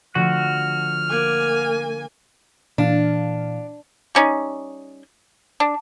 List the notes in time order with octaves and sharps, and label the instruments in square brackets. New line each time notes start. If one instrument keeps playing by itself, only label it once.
[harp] D3 F3 A3 [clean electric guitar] F#4 [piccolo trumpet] F6
[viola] A#3 G#5 [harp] D6 F#6
[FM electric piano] A#2 E3 F5 [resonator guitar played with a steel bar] D4
[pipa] G3 C#4 D#4
D4